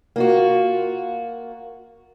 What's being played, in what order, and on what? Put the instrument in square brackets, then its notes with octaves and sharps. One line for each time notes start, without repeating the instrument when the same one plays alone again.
[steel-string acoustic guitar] A#3 F4 F#4